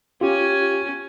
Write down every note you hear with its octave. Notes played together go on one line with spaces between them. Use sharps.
C#4 F4 G4 G#5